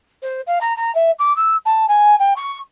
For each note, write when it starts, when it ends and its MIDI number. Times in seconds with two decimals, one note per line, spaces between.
0.22 0.41 72
0.47 0.58 77
0.61 0.76 82
0.76 0.93 82
0.95 1.11 76
1.19 1.35 86
1.36 1.55 88
1.65 1.86 81
1.88 2.16 80
2.19 2.34 79
2.36 2.58 85